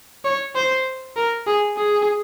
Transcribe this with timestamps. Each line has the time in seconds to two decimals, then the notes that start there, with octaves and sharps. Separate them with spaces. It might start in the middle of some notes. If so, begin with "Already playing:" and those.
0.25 C#5
0.55 C5
1.17 A#4
1.47 G#4
1.77 G#4